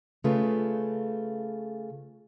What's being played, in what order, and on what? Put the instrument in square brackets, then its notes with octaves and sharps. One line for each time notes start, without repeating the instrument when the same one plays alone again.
[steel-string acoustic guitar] C#3 A3 F4 B4